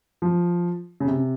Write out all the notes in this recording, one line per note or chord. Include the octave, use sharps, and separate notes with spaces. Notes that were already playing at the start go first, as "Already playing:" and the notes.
F3
C#3
C3